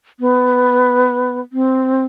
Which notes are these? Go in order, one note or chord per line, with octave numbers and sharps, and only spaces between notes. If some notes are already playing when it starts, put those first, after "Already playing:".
B3
C4